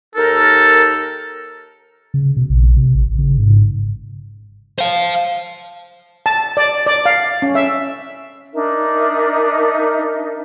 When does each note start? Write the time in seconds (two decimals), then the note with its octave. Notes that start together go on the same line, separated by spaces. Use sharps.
0.16 D#2 D#4 A4 A#4
2.14 C#3
2.37 B2
2.50 A#1
2.77 C3
2.95 G#1
3.19 C#3
3.38 G#2
4.79 C5 F5
6.26 A5
6.57 D5
6.87 D5
7.06 F5
7.42 C#4
7.55 E5
8.54 D4 D#4 A#4 E5